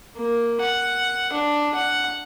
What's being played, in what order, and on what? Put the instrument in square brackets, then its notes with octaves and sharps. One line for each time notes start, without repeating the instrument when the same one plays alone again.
[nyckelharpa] A#3
F#5
D4
F#5